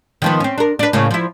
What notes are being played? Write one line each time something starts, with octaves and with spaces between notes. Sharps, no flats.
D#3 F3 B3
C4 C#4
D4 A#4
D4 B4
A2 C#3 A#3
F3 E4